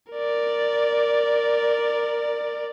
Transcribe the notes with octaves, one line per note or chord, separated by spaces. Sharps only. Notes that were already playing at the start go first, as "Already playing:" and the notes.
A#4 D5